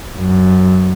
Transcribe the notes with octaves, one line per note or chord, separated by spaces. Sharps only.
F#2